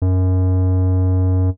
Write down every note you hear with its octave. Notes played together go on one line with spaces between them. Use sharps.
F#2